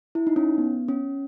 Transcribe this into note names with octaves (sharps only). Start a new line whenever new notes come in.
E4
D#4
C#4
B3
C#4